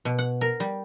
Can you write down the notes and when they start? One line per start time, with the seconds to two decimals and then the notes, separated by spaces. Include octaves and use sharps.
0.05 B2
0.18 F#5
0.41 A#4
0.60 G3